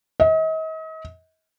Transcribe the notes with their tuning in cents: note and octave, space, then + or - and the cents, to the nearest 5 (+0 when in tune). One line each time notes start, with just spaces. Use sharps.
D#5 +40